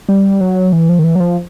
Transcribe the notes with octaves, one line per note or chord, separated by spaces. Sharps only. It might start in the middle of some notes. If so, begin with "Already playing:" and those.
G3
F#3
E3
F3
D#3
E3
F#3
F3